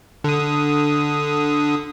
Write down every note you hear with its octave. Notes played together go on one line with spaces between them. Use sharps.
D3 D#6